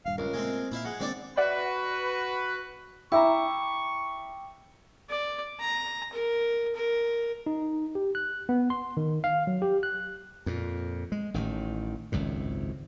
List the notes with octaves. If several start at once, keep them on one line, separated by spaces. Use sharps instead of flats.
D#1 G2 F5
C#2 A#4
A#2 G#3 A3 C4
A#2 E4 E5 F5
G#3 F#5
D#3 G#3 A#3 C4 D4 D5
F#4 B4 D5 E5 F#5
E4 E5 G5 A#5 C#6 D6 E6
D5
A#5
A#4
A#4
D#4
G4
F#6
B3
C6
D#3
F5
F#3
G4
F#6
F2 A#2
G#3
A1 A2 D#3
G#1 C#2 F#2 A2